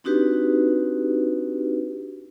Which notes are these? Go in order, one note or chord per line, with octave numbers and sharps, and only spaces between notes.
C4 D4 D#4 F#4 G4 B4